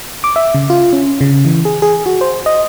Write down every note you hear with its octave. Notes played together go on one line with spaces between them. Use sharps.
D6
E5
C#3
F4
C#4
C#3
E3
G#4
G#4
F#4
C5
D#5